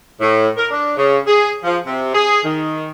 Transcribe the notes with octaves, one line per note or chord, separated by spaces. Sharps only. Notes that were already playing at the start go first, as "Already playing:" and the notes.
A2
A#4
D4
C#3
G#4
F3
C3
G#4
D#3